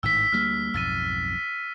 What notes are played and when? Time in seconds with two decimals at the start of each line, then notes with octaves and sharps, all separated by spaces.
0.03 G#1 A2 D#3 E6 B6
0.32 D2 G3 A#3 F6
0.74 B1 F2 G#2 E6 A6 D#7